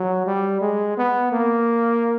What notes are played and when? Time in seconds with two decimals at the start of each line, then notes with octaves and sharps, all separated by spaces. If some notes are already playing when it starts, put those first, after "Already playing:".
Already playing: F#3
0.26 G3
0.61 G#3
0.97 B3
1.32 A#3